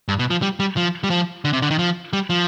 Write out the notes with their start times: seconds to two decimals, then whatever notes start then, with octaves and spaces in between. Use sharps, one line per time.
0.08 G2
0.19 B2
0.30 F3
0.42 G3
0.60 G3
0.77 F3
1.04 G3
1.10 F3
1.45 D3
1.53 C3
1.62 D3
1.71 D#3
1.79 F3
2.13 G3
2.30 F3